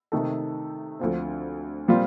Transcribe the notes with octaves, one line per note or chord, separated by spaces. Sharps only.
C3 D#3 A3 D#4 A4
D2 D3 F3 C4
A#2 G3 C4 F4